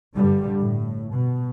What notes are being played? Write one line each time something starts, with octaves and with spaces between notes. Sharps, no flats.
G2 D3 G3
A2
B2